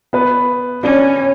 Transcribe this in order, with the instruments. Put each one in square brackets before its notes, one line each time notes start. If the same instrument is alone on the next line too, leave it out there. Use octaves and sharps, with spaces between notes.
[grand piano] B3 B4
[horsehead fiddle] C#4 [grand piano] D4 D5